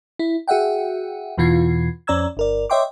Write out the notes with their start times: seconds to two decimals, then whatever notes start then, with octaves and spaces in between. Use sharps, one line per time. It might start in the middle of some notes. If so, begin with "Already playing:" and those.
0.19 E4
0.48 F#4 G#4 E5 F#5 G5
1.38 E2 B2 E3 F4 G#6 C7
2.07 F2 C#4 D5 A#5 E6 G#6
2.37 G1 A#4 D5
2.70 C#5 D#5 E5 G5 C6 D6